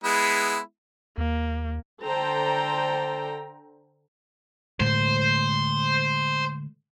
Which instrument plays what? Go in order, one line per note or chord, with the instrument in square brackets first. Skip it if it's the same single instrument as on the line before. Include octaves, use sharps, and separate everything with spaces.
[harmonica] G#3 B3 E4
[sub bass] D#2 [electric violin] A#3
[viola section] D3 A4 C5 G5 A#5
[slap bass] A2 D3 G#3 [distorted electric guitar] C5